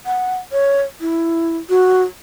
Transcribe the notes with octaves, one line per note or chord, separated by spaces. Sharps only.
F#5
C#5
E4
F#4